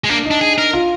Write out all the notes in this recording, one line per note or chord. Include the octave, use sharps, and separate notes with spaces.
G#3
A#3 D4
D#4
D4
G#4
A#4
F4